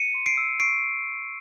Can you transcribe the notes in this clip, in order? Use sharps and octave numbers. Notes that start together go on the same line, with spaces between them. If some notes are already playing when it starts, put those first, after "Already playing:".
Already playing: C#7 D#7
C6
C7 D7
E6
C#6 C7 D7